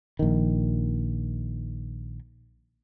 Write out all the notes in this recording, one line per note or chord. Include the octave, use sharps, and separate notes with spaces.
A#1 D#3